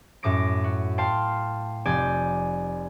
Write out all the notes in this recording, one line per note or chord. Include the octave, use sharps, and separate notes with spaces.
F#2 A2 D6 A#6 D7
F#4
F5 G5 A5 C6
F1 D5 G#5 G6